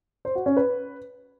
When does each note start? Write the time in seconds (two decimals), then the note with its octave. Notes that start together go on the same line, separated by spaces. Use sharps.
0.25 C5
0.35 F#4
0.46 C#4
0.57 B4